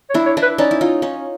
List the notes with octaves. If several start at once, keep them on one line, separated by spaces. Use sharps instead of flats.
C#5
D4 E4
C#5
D4 E4
B4
C#4 D#4 D5
E4
D#4 F4
C#4 D#4